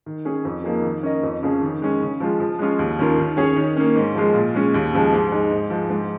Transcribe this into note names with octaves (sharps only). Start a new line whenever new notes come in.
D#3
C#4 G#4
F2
F3 A#3 D#4 G#4
D#3
C#4 A#4 D#5
F2
C#3 F3 C#4 G#4
D#3
G#3 C#4
C#3
F3 G#3 F4
F3
G#3 C#4 F4
D#2
D#3 C#4 F4 A#4
D#3
C#4 G#4 C#5
D#3
A#3 C#4
G#2
F3 G#3 F4
A#2
G#3 C#4
D#2
C#3 F3 G#3
G#2
G#3 D#4
G#2
F3 G#3
G#2